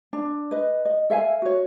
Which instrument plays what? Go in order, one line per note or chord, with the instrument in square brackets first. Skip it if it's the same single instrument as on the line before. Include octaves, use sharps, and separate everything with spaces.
[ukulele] D4
B4 D#5
D#5
A4 E5 F5 G#5
F#4 C#5